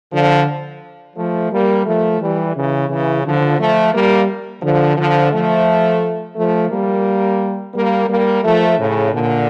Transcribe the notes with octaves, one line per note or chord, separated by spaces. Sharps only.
D3 F3
F3 A3
G3 A#3
F3 A3
E3 G3
C#3 E3
C#3 E3
D3 F3
F3 A3
G3 A#3
D3 F3
D3 F3
F3 A3
F3 A3
G3 A#3
G3 A#3
G3 A#3
F3 A3
A2 C#3
A#2 D3